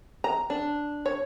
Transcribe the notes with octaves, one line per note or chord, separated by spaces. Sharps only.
A#5
D4
C#5